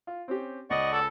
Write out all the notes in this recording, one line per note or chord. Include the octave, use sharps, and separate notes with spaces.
F4
C4 C#4 G4
C#2 D5 D#5 F#5 C#6
A4